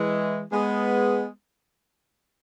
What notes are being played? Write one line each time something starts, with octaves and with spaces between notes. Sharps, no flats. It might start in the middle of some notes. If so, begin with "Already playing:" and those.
Already playing: E3 G#3
G#3 B3